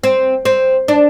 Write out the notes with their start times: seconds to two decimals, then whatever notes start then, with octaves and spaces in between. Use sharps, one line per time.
0.03 C4
0.45 C4
0.88 D4